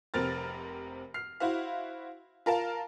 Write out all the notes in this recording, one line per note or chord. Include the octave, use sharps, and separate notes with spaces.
F1 C3 C4 A#4 F6 A6
F6 C7
E4 F#4 C5 F5
F4 A#4 F5 A5